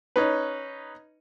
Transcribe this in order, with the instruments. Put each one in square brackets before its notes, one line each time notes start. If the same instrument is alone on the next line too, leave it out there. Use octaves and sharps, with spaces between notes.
[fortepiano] C#4 D#4 B4